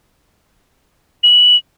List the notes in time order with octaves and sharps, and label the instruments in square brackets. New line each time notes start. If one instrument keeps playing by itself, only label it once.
[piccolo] F#7